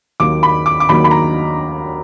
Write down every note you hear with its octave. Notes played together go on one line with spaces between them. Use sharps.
D#2 D#3 F#3 A#3 D6
B5
D6
D6
D#2 D#3 F#3 A#3 B5
B5
A#5